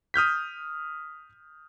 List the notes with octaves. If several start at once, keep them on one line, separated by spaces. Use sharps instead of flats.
D#6 F6 G6 B6